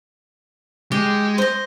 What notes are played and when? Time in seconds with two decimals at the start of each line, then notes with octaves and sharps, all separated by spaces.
0.92 G#3 G4
1.38 C5 D#5